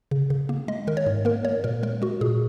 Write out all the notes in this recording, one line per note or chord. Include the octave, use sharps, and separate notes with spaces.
C#3
C#3
A#3
G#3 D#5
D#3 A#4
C#5
G#2
A#3 A#4
A#3 C#5
A#2 A#4
G#3 A#4
G#3 F#4
A#2 G#4